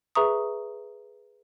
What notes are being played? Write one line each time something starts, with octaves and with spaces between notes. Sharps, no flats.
G#4 B4 E5 A#5 C#6 D#6